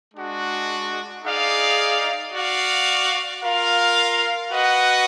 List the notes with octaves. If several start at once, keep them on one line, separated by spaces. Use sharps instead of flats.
G#3 D4 F#4
D#4 G#4 D5 F5
F#4 D5 F5
F4 A#4 F5
F#4 B4 D#5 F#5